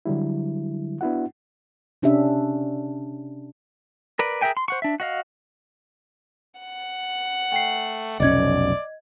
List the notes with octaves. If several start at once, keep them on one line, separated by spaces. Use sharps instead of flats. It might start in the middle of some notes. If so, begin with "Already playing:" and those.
D3 F#3 G3 E4
B3 D4 E4 F#4 F#5
C3 C#4 D4 G4 E5
A#4 B4 D5
G#4 A#4 E5 G5 G#5
C6
C5 F#5 C#6
D4 E5
F#4 D#5 F5
F#5
A3 G5 C7
F1 B1 C#4 D5 D#5 G#6